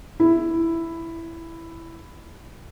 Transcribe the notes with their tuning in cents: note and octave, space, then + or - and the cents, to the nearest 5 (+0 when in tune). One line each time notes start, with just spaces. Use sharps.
E4 +5